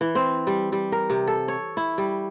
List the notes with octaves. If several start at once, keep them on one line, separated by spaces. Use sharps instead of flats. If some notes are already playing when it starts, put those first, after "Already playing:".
E3
C4
G3
G3
A#4
C3
A4
C#5
E4
G3